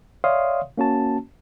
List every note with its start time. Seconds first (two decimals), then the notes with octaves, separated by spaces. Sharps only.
0.24 C#5 D5 E5 F5 C6 D#6
0.78 A#3 C#4 F#4 A5